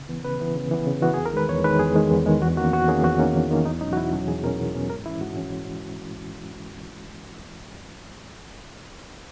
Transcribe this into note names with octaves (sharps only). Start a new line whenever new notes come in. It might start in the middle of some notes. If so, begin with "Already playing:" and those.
Already playing: C#3
E3 B3
C#3 B4
E3 B3
C#3
E3 B3
C#3
E3 B3 F#4
E2 G#4
A#4
D#3 G#3 B4
E2 C#5
D#3 G#3 B4
E2 G#4
D#3 G#3
E2
D#3 G#3
E2 F#4
D#3 A#3 C#4 F#4
E2 F#4
D#3 A#3 C#4 G#4
E2 F#4
D#3 A#3 C#4
E2
D#3 A#3 C#4
E2 D#4
B2 F#3 C#4 D#4
F#4
E2 E4
B2 F#3 C#4
E2 G#4
B2 F#3 C#4 A#4
E2
B2 F#3 C#4
G#2 A#4
E3 G#3 C#4 E4
G#2 F#4
E3 G#3 C#4